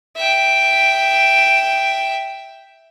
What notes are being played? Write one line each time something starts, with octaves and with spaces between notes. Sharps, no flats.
E5 G5